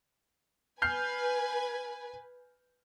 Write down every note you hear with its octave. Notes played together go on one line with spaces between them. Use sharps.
B4 G#5 F6 G6 C7